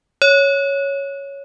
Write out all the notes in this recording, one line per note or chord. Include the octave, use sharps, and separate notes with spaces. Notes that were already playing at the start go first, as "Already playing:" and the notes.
C#5